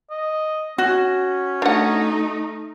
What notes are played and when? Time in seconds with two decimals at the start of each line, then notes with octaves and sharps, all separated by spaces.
0.11 D#5
0.78 C#4 F#4
1.62 A3 D4 D#4 F#5